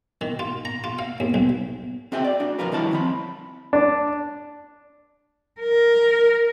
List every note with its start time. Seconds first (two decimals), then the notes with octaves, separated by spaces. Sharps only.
0.21 D#3
0.39 F4
0.65 A#5
0.84 F4
0.99 F5
1.20 D#2
1.34 B1
2.12 C4 F#4 G#4 E5 G5
2.24 D5
2.40 D4 F#4
2.59 B1 F2 F3 F4 A#4 B4
2.72 D#3 E3 G3 E4 C#5 A5
2.91 F3 C4 B5
3.73 D4
5.60 A#4